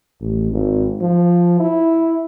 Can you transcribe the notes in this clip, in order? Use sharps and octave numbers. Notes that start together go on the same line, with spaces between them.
A1
G#1
F3
E4